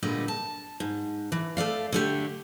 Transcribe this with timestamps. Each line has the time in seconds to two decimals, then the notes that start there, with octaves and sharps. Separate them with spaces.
0.03 A#2 D3 G3 G#3 B3
0.28 A5
0.80 G#2
1.32 E3
1.57 A3 A4 D5 F5
1.92 D3 A3 G4